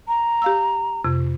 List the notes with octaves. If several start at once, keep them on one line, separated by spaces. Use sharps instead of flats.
A#5
G4 F5 E6
F2 C3